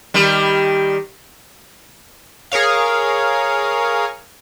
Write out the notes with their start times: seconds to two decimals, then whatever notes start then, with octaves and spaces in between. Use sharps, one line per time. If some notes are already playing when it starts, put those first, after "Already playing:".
0.14 D#3 G3
2.52 G#4 A#4 C#5 F5